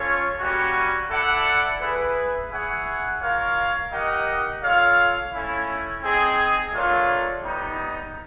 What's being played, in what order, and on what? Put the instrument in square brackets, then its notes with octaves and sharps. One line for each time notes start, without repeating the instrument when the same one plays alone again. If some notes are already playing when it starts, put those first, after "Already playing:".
Already playing: [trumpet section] C#4 F4 A4 C#5
G3 A#3 C#4 F#4
E4 A4 D5 F#5
E4 G#4 B4
E4 G#4 C#5 F#5
F4 A#4 C#5 F5
D#4 G4 A#4 D#5 F#5
F4 A4 C#5 F5
A3 C#4 E4
C4 D#4 G#4
A3 D4 F4 A#4 C#5
G3 B3 D#4